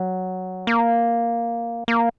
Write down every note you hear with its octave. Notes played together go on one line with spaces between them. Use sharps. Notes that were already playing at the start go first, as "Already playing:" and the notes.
Already playing: F#3
A#3
A#3